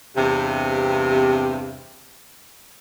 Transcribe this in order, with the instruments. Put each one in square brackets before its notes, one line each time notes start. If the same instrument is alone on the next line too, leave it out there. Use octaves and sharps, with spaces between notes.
[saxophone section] E2 G2 C3